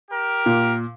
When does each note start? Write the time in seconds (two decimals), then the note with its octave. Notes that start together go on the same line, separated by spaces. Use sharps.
0.10 G4 A#4
0.46 A#2